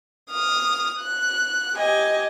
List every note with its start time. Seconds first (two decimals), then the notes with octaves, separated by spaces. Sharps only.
0.30 D#6 F6
0.99 F#6
1.76 G4 D#5 G#5